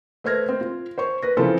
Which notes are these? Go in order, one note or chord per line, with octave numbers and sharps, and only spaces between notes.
A3 B4 C5 F6 G#6 A#6
C4
F4
C5 C#5 C#6
B4 A#6
C#3 E3 F3 C4 F4 A4